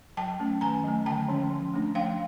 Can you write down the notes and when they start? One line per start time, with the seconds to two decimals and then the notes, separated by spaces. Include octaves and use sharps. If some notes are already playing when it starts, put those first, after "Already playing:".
0.17 F#3 G5 A5
0.40 A3 C#4
0.61 D#3 G#5 A#5
0.84 F#3 A3
1.06 D3 G5 A5
1.28 F3 G#3 C#4
1.50 F3
1.74 A3 D4
1.95 F3 F5 G5